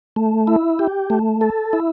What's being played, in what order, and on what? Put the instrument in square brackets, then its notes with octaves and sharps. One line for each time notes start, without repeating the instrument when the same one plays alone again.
[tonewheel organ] A3
E4
G4
A3
A4
E4